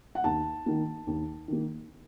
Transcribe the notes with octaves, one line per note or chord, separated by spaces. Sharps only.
F#5
D#2 A5
D#3 A#3
D#2
D#3 A#3